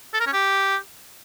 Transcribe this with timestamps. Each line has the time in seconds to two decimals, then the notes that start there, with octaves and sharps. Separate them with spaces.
0.14 A4
0.20 A#4
0.26 C#4
0.33 G4